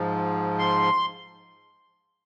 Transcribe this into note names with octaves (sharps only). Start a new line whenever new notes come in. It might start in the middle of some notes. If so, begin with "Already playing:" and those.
Already playing: G#2 F3
C6